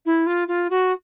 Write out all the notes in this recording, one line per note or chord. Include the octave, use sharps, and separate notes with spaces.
E4
F4
F4
F#4